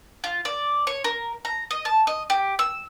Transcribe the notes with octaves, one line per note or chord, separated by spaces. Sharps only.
F4
D5
C#5
A#4
A#5
D#5
A5
D#5
G4
E6